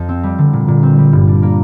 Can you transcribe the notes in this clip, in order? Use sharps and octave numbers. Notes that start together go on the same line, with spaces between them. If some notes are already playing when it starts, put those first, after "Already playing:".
Already playing: F2
C4
G3
D3
A#2
A#2
C4
G3
G2
D4
A#3